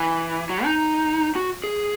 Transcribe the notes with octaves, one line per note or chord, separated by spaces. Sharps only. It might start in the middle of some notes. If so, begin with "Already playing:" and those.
Already playing: E3
F#3
D#4
F#4
G#4